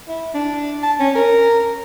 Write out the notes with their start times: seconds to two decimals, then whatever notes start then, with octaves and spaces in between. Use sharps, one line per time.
0.08 E4
0.34 D4
0.83 A5
1.00 C#4
1.15 A#4